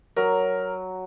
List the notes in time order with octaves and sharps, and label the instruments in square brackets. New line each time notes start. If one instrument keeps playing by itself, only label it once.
[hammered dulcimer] F#3 [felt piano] A#4